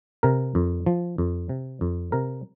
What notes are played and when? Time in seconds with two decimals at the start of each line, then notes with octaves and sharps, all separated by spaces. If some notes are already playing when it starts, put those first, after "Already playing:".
0.23 C3 A#4
0.55 F2
0.86 F3
1.18 F2
1.49 C3
1.81 F2
2.12 C3 A#4